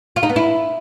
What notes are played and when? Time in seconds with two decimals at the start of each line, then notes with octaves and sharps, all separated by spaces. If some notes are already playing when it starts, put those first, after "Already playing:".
0.16 F4
0.23 D#4
0.29 B3
0.36 E4